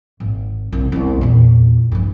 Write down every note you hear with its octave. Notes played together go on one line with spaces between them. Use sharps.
G#1
C2
C2 B3
E2 A#2
G2 E3